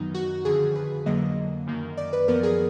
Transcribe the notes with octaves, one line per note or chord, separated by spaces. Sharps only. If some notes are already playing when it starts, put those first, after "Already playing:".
Already playing: F#2 D#3 F#3 B3 D#4
F#4
F2 D3 F3 G#4
B4
F2 D3 F#3 A#3 D#5
F#2 D#3 A#3
D5
B4
F#2 F3 B3 A#4
G#4